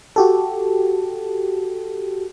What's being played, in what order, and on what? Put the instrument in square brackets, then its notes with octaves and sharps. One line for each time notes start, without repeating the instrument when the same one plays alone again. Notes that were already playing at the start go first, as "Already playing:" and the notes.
[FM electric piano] F#4 G4 A4